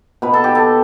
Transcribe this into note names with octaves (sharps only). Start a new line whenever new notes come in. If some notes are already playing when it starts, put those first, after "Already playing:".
B2 B4
A4
G4
A4